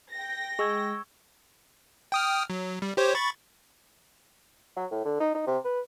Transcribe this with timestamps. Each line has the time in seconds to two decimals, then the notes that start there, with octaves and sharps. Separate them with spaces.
0.13 G5 A#6
0.59 G#3 C#6 E6 G#6
2.12 G5 D#6 F6
2.50 F#3
2.82 G3
2.97 G4 C5 C#5
3.15 B5 C#6 A6
4.76 F#3
4.91 A2
5.05 D3
5.20 D#4
5.34 D#4
5.47 C3
5.64 B4